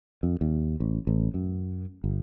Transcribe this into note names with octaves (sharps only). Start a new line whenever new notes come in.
F2
D#2
A1
A1
F#2
G1